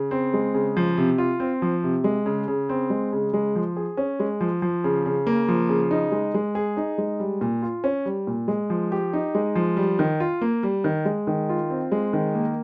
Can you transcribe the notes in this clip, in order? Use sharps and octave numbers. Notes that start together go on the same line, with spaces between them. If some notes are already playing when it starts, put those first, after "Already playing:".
Already playing: C#3
C4
G#3
C#3
F3
C3
F4
C4
F3
C3
G#3
C#3
C#3
C4
G#3
C#3
G#3
F3
G#4
C#4
G#3
F3
F3
C#3
C#3
A#3
F3
C#3
D#4
G#3
G#3
G#4
D#4
G#3
G3
A#2
F4
C#4
G3
A#2
G#3
F3
G4
D#4
G#3
F3
G3
D#3
F4
A#3
G3
D#3
G#3
D#3
F4
C4
G#3
D#3
A#3